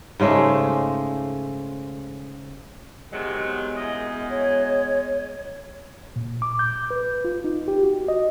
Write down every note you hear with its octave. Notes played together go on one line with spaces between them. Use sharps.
G#2 C#3 G#3 A3
C3 D#3 F#3 G#3 B3
F#2 E4 D#5
C#5
A#2
D6
G6
B4
F4
D#4
G4
F#4
D#5